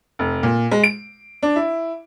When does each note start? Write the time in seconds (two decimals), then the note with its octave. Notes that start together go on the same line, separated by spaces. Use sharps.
0.19 F1
0.43 A#2
0.71 G#3
0.84 D7
1.43 D4
1.56 E4